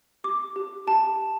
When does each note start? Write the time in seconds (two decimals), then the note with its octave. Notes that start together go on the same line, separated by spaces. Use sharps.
0.24 G4 D6
0.56 G4
0.87 G4 A5